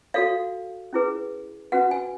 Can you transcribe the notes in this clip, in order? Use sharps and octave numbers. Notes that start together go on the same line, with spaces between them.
F#4 A4 C#5 F5
C#4 E4 G#4 B4
C#4 F#4 B4 F#5
G#5